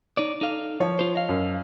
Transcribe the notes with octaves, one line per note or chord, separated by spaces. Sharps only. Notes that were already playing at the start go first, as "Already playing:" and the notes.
D#4 C#5 D5
D#4 A4 F5
F3 C#5
F4 C5
D#5 F5
F#2